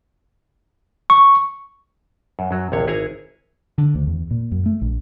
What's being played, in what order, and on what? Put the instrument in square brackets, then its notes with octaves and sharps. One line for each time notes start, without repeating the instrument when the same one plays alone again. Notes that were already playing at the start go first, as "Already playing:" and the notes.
[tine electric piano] C#6
[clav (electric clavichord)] F#2
F#2 F#3
A#1 D#2 C3 C#5
G#1 E4 G#4 C#5 G#5 A#5
[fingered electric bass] D3
D2
E2
A#2
F#2
A3
A#1